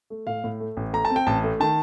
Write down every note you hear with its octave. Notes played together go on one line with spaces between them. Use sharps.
A3
A2 F5
A2
A3
A1
A3 A#5
A5
C4
G5
A1 A5
A3
D#3 A5